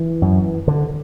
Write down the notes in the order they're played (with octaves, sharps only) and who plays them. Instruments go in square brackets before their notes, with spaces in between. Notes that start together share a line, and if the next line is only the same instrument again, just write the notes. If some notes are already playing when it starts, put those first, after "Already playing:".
Already playing: [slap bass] E3
F#2
D3